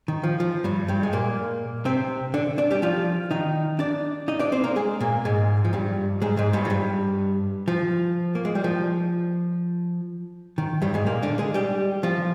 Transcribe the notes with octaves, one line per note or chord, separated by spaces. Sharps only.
D#3
F3
F3
G2 G3
G2 G3
G#3
A#2 A#3
C3 C4
D3 D4
D4 D5
G3 G4
F3 F4
D#3 D#4
D4 D5
D#4 D#5
D4 D5
C4 C5
A#3 A#4
G#3 G#4
A#2 A#3
G#2 G#3
F3
G2 G3
G#2 G#3
G#2 G#3
G2 G3
F3
G2 G3
F3
A#3
G#3
G3
F3
D#3
G2 G3
G#2 G#3
A#2 A#3
D3 D4
G#3 G#4
G3 G4
F3 F4